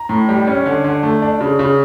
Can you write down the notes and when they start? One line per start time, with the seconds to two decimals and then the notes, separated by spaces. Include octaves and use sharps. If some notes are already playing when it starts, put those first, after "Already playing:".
Already playing: A#5
0.09 A2
0.29 G3
0.47 C#4
0.66 D3
0.84 D3
1.03 A3
1.22 D4
1.41 C#3
1.59 C#3